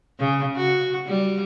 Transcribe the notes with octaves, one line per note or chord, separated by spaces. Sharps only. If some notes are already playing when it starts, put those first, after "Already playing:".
C#3
F#4
G3